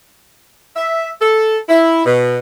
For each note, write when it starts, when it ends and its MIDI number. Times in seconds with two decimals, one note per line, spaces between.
0.76 1.10 76
1.21 1.58 69
1.69 2.04 64
2.06 2.38 47